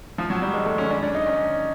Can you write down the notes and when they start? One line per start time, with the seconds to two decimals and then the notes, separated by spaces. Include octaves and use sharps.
0.18 F3
0.30 F#3
0.42 G3
0.54 G#3
0.66 A3
0.78 C#4
0.90 D4
1.02 D4
1.15 D#4
1.27 C#4